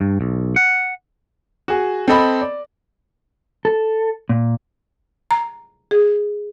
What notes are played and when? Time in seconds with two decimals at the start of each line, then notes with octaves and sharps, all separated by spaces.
0.01 G2
0.21 B1
0.56 F#5
1.68 F#4 G#4
2.08 C4 A4 D#5 B5
2.41 D5
3.65 A4
4.29 A#2
5.31 A#5
5.91 G#4